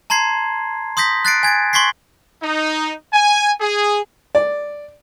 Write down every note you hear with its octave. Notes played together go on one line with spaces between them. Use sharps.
A5 A#5 C6 G#6 C7
C6 D#6 G6 A#6 B6
F#6 A6 C7 D7
G#5 G#6 A6 D7
C6 C#6 G#6 B6 C7
D#4
G#5
G#4
D5